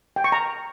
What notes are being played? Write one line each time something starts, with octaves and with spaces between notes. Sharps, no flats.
G5
C#6
A#5